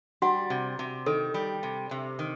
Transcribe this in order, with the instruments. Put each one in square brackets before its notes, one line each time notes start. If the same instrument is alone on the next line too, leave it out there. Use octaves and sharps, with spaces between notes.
[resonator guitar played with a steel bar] G3 [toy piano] F#4 F#5
[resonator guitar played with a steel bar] C3
C3
[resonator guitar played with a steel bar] D#3 [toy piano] A4
[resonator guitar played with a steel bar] G3
C3
C3
D#3